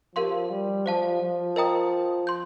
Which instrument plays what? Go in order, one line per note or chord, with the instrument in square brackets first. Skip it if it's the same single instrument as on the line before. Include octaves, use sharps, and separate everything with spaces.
[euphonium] F3 [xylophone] G4 A#4 F5 C6
[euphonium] G3
[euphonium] F3 [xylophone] C5 F5 A5
[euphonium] F3
[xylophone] A#4 D#5 G5 A#5 D#6
C6 G6